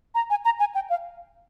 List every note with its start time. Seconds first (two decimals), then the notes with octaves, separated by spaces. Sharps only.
0.15 A#5
0.30 G#5
0.45 A#5
0.60 G#5
0.75 G5
0.90 F5